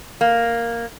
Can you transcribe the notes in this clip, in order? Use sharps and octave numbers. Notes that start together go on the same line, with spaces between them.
A#3